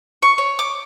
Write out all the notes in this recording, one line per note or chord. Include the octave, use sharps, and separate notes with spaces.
C#6
C#5
D6